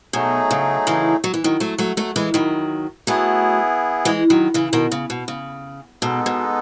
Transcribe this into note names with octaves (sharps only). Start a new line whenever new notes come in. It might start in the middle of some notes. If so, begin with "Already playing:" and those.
B2 F#3 A3 D#4 G#4
C#3
C#3 E3
F#3
E3
D#3 F#3
F#3 A3
F#3 A3
F#3 A3
E3 G#3
D#3 F#3
F#3 A3 B3 E4 G#4
E3 G#3
D#3 F#3
C#3 E3
B2 D#3
C#3
B2
C#3
B2 G#3 B3 D#4 A4
B2